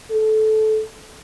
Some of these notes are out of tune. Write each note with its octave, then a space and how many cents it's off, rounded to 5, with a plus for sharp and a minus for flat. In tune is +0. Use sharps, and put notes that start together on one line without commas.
A4 -20